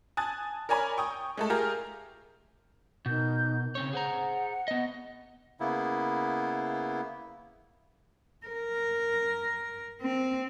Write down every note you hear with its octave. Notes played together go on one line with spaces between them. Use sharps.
G#5 A5 D#6 F#6 A6
A#4 C#5 D5 G#5 A#5 B5
G5 C#6 D#6
G#3 A3 A4
F4 G4 G#4 A#4
B2 D#4 A#4 G6
C#3 C4 C#5
G#4 C5 F#5 A#5
B3 D#5
C#3 A#3 B3 E4
A#4
C4